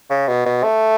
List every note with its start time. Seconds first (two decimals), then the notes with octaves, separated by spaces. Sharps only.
0.10 C#3
0.28 B2
0.46 B2
0.64 A3